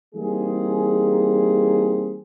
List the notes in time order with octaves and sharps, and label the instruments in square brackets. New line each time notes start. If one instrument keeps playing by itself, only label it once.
[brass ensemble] E3 G3 A#3 C4 D#4 G#4